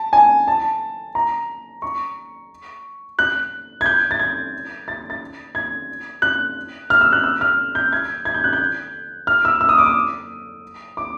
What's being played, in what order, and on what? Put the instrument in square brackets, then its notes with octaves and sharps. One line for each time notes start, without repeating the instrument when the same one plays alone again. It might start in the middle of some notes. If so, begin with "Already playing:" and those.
Already playing: [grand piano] A5
G#5
A5
A#5
C#6
F#6
G#6
G6
A6
G#6
A6
A6
G#6
F#6
F6
E6
F#6
E6
F6
G6
G#6
G#6
G6
F#6
G6
F6
E6
E6
D#6
D6
D#6
D6